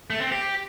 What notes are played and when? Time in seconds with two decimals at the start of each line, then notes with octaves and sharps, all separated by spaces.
0.10 A3
0.21 C4
0.32 G4